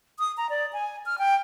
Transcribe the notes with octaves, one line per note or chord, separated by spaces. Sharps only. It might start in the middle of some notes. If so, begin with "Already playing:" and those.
D#6
A#5
D5
G#5
F6
G5